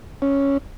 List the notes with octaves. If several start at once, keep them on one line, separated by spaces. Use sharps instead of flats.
C#4